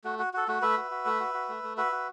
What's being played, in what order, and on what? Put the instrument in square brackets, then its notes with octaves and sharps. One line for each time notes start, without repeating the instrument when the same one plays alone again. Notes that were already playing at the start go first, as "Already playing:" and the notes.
[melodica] A3 F#4
F#4
F#4 A4
A3 F#4
A3 B4 E5
F#4
F#4
A3
F#4
F#4
A3
A3
F#4 B4 E5
F#4